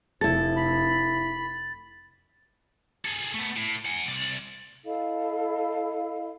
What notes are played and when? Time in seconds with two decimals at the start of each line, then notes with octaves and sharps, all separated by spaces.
0.21 F1 E4 A4 A6
0.56 B5
3.05 G#4 A4
3.35 A3 B3
3.57 A2
3.86 F#5 G#5
4.07 C2 D5
4.85 E4 A4 D#5 F5